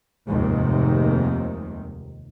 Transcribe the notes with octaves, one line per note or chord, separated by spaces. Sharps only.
F1 D#2 G#2 C3 D#3